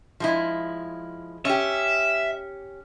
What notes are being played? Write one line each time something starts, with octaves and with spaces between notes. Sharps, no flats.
F3 G#3 E4
C#4 G4 E5